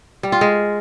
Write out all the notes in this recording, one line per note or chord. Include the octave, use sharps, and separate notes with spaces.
G3
F4
G#3